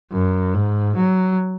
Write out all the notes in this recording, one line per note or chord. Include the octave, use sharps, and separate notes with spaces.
F#2
G#2
F#3